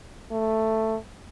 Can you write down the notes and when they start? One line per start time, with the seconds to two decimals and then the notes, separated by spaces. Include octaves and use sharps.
0.31 A3